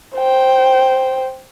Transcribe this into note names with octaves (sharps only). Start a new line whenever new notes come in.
C5 G5